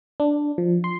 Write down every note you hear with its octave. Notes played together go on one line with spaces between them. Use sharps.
D4
F3
C6